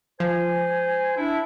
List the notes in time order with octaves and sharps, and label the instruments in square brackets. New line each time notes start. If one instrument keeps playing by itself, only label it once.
[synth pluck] F3 [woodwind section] C5 G#5
[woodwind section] D4 E4